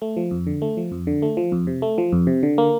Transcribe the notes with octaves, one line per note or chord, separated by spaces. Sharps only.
A3
F3
F2
D3
A3
F3
F2
D3
A3
F3
F2
C3
A3
F3
F2
C3
D3
A#3